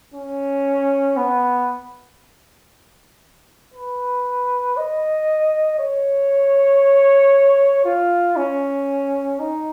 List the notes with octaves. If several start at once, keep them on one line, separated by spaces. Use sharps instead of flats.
C#4
B3
B4
D#5
C#5
F4
C#4
D#4